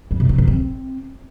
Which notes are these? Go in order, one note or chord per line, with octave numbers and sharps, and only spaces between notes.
G3
C3
D#4
D#3
C4